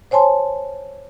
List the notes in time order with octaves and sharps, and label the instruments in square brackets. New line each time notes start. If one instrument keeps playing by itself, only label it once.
[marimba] C5 C#5 G#5 A5 C6